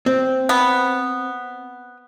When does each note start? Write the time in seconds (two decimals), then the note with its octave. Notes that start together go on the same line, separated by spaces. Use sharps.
0.06 C4
0.49 B3